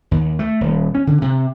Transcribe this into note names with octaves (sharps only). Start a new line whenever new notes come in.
D#2
A3
D#1
C#4
D3
C3